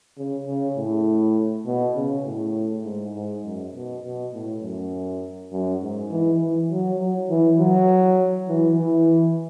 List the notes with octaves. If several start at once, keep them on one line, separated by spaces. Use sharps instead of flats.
C#3
C#3
A2
B2
C#3
A2
G#2
G#2
F#2
B2
B2
A2
F#2
F#2
G#2
E3
E3
F#3
F#3
E3
F#3
E3
E3